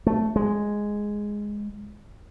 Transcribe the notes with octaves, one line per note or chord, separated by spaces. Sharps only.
A3
G#3